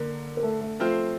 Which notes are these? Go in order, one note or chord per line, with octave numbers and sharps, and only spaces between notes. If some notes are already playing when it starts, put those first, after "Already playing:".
Already playing: D3 A#3 A#4
A#4
A3 A4
A3 A4
F3 A3 C4 F4 A4 C5